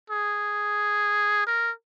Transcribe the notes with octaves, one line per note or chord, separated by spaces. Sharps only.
G#4
A#4